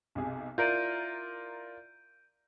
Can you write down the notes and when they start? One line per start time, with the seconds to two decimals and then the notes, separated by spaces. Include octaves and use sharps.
0.15 B1 C3 G#4
0.58 E4 F4 A#4 D5 A#5 G6 D7 D#7